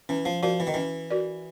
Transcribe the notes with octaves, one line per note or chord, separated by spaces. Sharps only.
E3 C#4
F3
F3 F#4 A#4 D5
E3
D#3
E3 C#4
F#4 A#4 D5